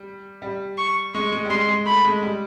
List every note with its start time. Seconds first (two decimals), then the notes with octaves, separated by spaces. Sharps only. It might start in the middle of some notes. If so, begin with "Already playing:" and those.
Already playing: G3
0.42 G3
0.78 C#6
1.14 G#3 C#6
1.32 G#3
1.45 G3
1.50 G#3 C6
1.68 G#3
1.86 A3 B5
2.04 G#3
2.22 G3